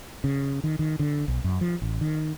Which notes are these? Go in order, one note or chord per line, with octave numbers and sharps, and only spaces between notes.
C#3
D#3
D#3
D3
B1
F#2
F3
A1
D#3